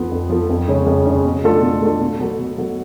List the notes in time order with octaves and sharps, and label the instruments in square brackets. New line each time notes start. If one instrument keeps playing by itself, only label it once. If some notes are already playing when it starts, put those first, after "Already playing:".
Already playing: [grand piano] F2 F3 B3 F4 A4
F2
F3 B3 F4 A4
F2
C#3 G#3 C#4
F2
C#3 G#3 C#4
B2
A3 D4 F4 A4
B2
A3 D4 F4 A4
B2
F#3 B3 F#4 A4
B2
F#3 B3 F#4 A4